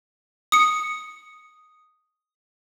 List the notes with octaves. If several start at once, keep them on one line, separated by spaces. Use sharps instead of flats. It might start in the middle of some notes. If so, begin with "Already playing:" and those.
D#6 C#7